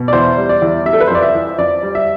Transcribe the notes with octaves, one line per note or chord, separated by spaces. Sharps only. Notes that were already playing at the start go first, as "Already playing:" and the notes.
Already playing: B2
D5
E2 C5
G3
D5
E2
G3 E5
A4
B4
C5
F2 D5
E5
E3
F2 D5
G3
E5